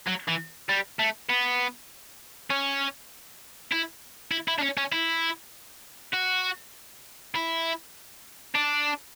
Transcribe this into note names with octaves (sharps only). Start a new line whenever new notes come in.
F#3
E3
G3
A3
B3
C#4
E4
E4
E4
D4
C#4
C#4
E4
F#4
E4
D4